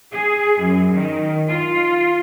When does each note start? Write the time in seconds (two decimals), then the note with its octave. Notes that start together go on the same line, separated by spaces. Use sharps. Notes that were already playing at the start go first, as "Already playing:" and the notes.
0.11 G#4
0.60 F#2
0.95 D#3
1.48 F4